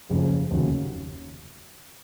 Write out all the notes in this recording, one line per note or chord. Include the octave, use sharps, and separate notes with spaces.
F#1 F2 C#3 F3
F1 D#2 C#3 F#3